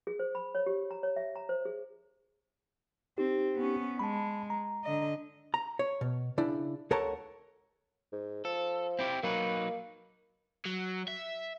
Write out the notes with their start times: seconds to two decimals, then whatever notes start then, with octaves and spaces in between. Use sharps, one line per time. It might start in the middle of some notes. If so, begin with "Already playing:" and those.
0.07 G#4
0.19 C5
0.35 B5
0.55 C#5
0.66 G4
0.91 A#5
1.03 C#5
1.16 E5
1.36 A#5
1.49 C5
1.65 G#4
3.18 C4 D#4 G4
3.56 B3 C#4
3.99 G#3 A5 B5
4.50 A#5
4.84 D3 D#5
5.54 A#5
5.79 C#5
6.01 B2
6.38 C#3 D4 E4
6.91 C#2 A4 A#4 C#5 F#5 A5
8.12 G#2
8.45 F3 A4
8.99 C4 E4 G4
9.23 F#3 A#3 D#4 B4
10.65 F#3
11.08 E5